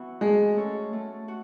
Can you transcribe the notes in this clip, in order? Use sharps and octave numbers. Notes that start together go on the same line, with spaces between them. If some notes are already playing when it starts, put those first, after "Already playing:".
Already playing: E3 B3 F#4
G#3 A3
C#4 F#4 A4 C#5
A3
F#4